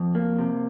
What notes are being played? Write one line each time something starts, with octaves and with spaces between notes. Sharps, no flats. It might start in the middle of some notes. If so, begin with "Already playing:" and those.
Already playing: F2
A#3
C3